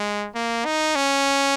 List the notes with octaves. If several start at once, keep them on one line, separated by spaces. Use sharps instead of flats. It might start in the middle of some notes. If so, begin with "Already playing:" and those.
Already playing: G#3
A#3
D#4
C#4